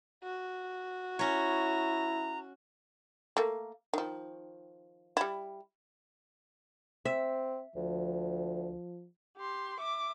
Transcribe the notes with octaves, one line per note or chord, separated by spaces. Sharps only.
F#4
C#4 E4 C#5 A#5
A3 A#3
D#3 F3
G3 E4
C4 E5
D2 F3
G4 C6
E5 D6